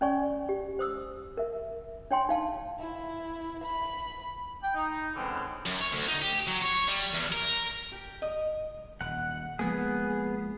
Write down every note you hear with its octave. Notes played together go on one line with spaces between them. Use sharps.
C#4 C#5 D5 G#5 C#6
G4
C5 D#6 E6
A#4 E5
D4 C#5 G5 G#5 C6
D#4 F5 A5
E4
B5
G5
D#4
B2 D3 E3 G#3 C4 C#4
F#2
C#5
D2
D#4
G4
F#3
C#5
G3
E2
A#4
G4
D#5
D#1 F#5
F3 G#3 A#3 B3 G#4